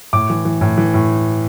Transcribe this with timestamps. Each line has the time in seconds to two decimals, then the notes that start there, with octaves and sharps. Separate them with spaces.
0.13 A2 D6
0.30 E3
0.45 E3
0.61 A2
0.78 E3
0.94 A2